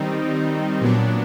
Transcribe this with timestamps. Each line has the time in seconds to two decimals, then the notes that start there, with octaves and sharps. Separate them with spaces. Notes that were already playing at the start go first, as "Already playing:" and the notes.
Already playing: D#3 G3 C4 D#4
0.82 A#2 F#3 B3 D4